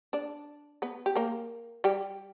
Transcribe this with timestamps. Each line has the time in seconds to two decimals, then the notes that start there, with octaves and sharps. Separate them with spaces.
0.13 D4 D5
0.82 B3 B4
1.06 G4
1.15 A#3 A#4
1.84 G3 G4